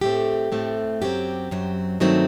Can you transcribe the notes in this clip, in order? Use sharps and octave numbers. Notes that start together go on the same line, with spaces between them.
A2 A3 C4 G4
A2 A3 C4
F#2 F#3 C4 G4
F#2 F#3 C4
G2 D#3 F#3 A3 C4